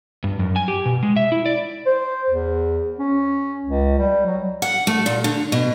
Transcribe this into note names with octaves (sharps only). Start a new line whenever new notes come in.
G2
F#2
G#5
G4
B2
G#3
E5
E4
D5
C5
E2
C#4
C#2
G3
F#3
F#5
A3
A#2
D3
B2